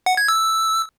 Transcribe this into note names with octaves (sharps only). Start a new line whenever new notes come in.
F#5
G#6
E6